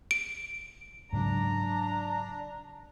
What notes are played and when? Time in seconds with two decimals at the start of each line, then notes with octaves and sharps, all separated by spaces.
0.11 D7
1.13 G#2 C#3 F#3 D4 A#5